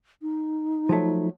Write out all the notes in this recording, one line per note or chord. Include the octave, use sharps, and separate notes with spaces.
D#4
F3 F#3 A3